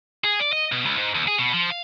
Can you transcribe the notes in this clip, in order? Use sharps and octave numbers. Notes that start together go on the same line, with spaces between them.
G#4
D5
D#5
B2
C#2
G#2
D#2
G#4
B2
F3
F5